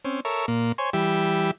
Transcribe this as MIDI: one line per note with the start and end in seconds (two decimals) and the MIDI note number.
0.05 0.20 60
0.05 0.20 61
0.25 0.46 69
0.25 0.46 70
0.25 0.46 73
0.25 0.46 76
0.48 0.72 46
0.48 0.72 58
0.78 0.90 72
0.78 0.90 73
0.78 0.90 80
0.93 1.51 52
0.93 1.51 55
0.93 1.51 67
0.93 1.51 76